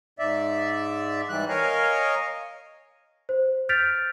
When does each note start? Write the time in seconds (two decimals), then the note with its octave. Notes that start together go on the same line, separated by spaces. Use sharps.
0.19 G#2 D5 E5
1.29 G#2 E3 G3 F#6
1.49 A#4 C#5 D#5 F5 G#5
3.29 C5
3.69 F6 G6 A6 B6 D7 F7